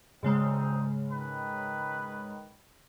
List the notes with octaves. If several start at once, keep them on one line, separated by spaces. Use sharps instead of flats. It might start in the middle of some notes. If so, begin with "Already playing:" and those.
D2 G#2 C#3 G#3 C4 D#4
D#3 B4